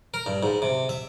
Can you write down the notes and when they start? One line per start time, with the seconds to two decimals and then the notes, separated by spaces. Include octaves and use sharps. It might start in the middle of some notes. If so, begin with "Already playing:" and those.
0.14 A#4
0.26 G2
0.43 G#2
0.62 C3
0.89 E5